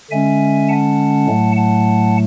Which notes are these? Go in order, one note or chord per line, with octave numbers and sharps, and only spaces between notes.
D3 G#3 C#4 E5 G#5
F#5 A5
A2 F#3 A3
F#5 A5